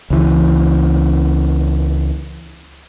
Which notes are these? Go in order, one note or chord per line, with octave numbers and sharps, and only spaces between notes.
C#2 E3